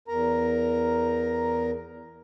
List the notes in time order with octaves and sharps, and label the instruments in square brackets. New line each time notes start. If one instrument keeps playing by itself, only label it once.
[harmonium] E2 A#4 A#5